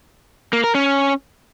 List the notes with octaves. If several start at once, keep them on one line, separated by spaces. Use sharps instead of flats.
A#3
A#4
C#4